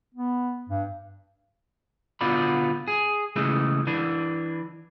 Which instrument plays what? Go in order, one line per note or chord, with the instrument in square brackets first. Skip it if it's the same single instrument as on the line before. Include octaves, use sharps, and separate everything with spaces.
[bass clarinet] B3
G2
[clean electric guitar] B2 D3 B3 F4 D5 B5
G#4
C#3 E3 G#3 A3
E3 D4